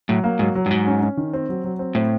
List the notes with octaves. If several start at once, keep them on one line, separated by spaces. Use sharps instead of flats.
A2 F#3
A#3
G#2 F#3
F#3
G2
G#2 F#3
C#4
C#4
D#3
C4
F#3
F#3
C4
A2 C4